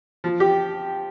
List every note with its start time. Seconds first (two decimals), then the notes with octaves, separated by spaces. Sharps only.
0.24 F3
0.40 G4